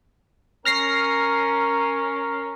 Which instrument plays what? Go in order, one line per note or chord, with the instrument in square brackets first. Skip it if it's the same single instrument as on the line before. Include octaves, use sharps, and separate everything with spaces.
[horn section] C#4 A#4 [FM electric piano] F6 A#6 C7